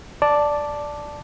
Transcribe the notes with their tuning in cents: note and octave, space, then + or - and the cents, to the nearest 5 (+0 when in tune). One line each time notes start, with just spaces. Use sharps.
D5 +0 A5 +0